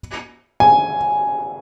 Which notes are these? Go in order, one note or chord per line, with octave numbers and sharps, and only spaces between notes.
G#5